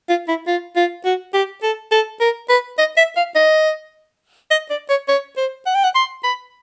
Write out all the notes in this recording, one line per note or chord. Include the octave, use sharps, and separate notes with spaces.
F4
E4
F4
F4
F#4
G4
A4
A4
A#4
B4
D#5
E5
F5
D#5
D#5
D5
C#5
C#5
C5
F#5
G5
F#5
C6
B5